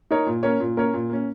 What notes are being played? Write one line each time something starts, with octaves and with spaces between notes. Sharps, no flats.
D#4 A#4 C#5
A#2
A#3 C#4 A#4 C#5
A#2
A#3 C#4 A#4 C#5
A#2
A#3 C#4